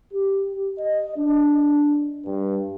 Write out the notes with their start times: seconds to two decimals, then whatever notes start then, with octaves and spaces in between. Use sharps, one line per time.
0.14 G4
0.79 D#5
1.17 D4
2.25 G2